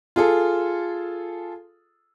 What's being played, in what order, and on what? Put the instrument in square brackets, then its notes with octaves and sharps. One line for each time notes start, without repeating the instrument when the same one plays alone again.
[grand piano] F4 G#4 A4